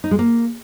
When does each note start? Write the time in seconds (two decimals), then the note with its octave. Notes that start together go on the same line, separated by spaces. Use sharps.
0.04 D#4
0.11 G#3
0.19 A#3